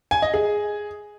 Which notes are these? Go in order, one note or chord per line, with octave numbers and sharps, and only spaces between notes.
G#5
D#5
G#4